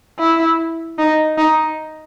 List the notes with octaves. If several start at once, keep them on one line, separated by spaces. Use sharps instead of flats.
E4
D#4
D#4